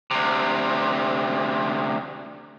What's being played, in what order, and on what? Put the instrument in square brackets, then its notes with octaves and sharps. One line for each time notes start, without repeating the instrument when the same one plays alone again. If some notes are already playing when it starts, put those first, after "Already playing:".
[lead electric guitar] D2 C3